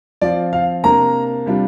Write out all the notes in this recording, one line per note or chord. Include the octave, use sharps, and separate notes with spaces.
F3 C4 F4 D5
F5
C3 A#3 D4 A#5
C3 G3 D4 F4